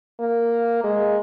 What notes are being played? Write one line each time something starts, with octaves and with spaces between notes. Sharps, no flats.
A#3
G#3